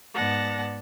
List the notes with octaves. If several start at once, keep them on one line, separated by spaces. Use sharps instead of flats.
G#2 B3 D5 F#5 A5 A#6